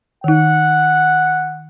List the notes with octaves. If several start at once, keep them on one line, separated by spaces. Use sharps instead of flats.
D#3 D#4 F#5